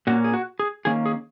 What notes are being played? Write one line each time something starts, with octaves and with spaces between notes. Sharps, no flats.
A#2 A#3 C#4 F#4
G#4
F#4
G#4
D#3 A#3 C#4 G#4
G#4